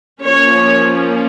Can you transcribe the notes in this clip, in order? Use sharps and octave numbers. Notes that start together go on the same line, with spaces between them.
F3 A#3 C#4 C#5